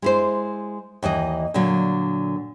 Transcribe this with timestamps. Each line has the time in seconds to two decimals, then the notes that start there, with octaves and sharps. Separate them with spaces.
0.02 G#3 E4 C5
1.03 D#2 E3 D5 D#5
1.54 A#2 D3 F#3